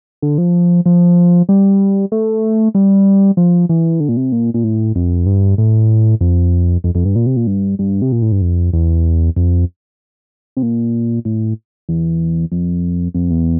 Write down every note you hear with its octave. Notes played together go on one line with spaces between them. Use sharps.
D3
F3
F3
G3
A3
G3
F3
E3
D3
A#2
C3
A#2
A#2
A2
F2
G2
A2
F2
F2
F2
G2
A#2
C3
A#2
G2
G2
C3
A#2
A2
G2
F2
E2
F2
C3
A#2
A2
E2
F2
F2
E2